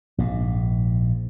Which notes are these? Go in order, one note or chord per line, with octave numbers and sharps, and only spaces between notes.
A#1 G#2